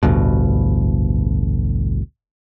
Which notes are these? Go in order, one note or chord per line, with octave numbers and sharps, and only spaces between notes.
A1 D2 G2 B2